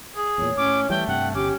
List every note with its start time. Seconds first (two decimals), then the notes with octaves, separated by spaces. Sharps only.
0.16 G#4
0.38 E2 A#2 C#5
0.57 A2 C#4 D6
0.90 E3 G3 A3 G5
1.08 G2 C3 F#5 G5
1.34 G1 C#4 G4 D6